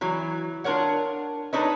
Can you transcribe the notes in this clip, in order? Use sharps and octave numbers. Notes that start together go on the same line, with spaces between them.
E3 F#3
D4 F4 A#4 C#5 F#5
D4 D#4 A4 B4 C#5 D#5